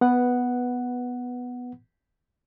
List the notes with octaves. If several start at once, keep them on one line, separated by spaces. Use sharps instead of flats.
B3 B4 F#5